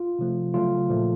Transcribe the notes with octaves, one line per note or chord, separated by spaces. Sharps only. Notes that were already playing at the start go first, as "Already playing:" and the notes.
Already playing: F4
C3 F3 A3
C#3 F#3 A3 F4
A#2 F3 A3